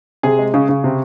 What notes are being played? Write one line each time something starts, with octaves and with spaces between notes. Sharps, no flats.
C3 G#4
G#3
C#3
C#3
C3